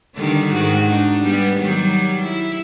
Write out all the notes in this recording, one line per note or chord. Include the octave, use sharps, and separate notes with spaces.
D3 D#3 G3
G#2 D#3 F#4
D4 D#4
G3 B3
D#3 F#3 G3
E4